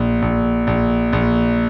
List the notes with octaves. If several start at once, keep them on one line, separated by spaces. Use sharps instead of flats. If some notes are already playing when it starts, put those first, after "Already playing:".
Already playing: A#1
A#1
A#1
A#1